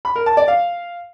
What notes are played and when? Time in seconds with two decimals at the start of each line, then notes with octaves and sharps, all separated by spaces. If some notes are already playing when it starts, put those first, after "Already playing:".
0.05 B5
0.16 A#4
0.26 A5
0.37 D5
0.48 F5